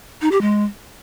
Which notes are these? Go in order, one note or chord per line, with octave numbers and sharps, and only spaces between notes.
D#4
G4
G#3